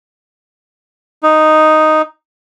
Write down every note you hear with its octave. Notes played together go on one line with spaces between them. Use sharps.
D#4